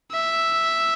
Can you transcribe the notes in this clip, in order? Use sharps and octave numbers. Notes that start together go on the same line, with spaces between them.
E5